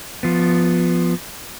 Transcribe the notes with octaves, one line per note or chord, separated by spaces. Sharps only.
F3 B3